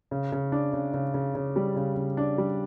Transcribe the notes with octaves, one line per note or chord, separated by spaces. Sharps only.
C#3
C#3
D4
C#3
C#3
C#3
C#3
G3
C#3
C#3
D4
G3